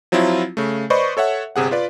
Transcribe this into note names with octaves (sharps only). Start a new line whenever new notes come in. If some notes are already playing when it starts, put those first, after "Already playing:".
F3 F#3 C4 E4 F4
C#3 A3
B4 C5 D5 D#5 B5 C#6
A4 C#5 E5 F#5
G1 C3 G#4 F#5
F4 B4 D5